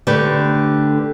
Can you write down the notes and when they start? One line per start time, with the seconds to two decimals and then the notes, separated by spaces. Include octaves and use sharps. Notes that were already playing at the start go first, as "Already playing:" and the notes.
0.07 D3 A3 G4 B4